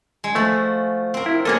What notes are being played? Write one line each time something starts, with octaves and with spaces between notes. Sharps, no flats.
G#3
F3 A3 F#4
C4 A#4
E4
F#3 A#3 G#4 A4 D#5